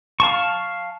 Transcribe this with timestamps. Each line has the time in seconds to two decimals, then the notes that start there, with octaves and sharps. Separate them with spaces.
0.20 F5 A5 C#6